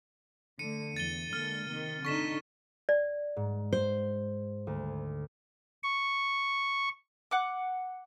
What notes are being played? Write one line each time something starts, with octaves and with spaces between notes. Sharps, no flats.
D3 A3 C#7 D#7
E2 A6 D#7 G7
D3 G#3 A#3 F6
C3 D#3
D3 D#4 C#6 B6 E7
D5
G#2
C5
D2
C#6
F#5 D6